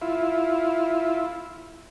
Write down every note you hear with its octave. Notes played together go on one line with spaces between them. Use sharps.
E4 F4